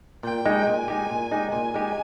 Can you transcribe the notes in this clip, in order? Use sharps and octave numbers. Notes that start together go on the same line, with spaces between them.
A#2 G5
G#3 D#4 G4
A#2 G#5
G#3 D#4 G4
A#2
G#3 D#4 G4
A#2 G#5
G#3 D#4 G4